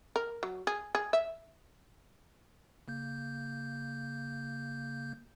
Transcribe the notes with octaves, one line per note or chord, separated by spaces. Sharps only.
A#4
F#3
G#4
G#4
E5
C#3 A#3 G6